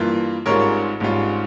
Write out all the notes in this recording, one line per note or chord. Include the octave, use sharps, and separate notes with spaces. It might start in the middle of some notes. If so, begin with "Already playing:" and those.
Already playing: G2 E3 A#3 F4
G#1 G#2 G3 C#4 F4 A#4 C#5
G#1 G#2 G3 C#4 F4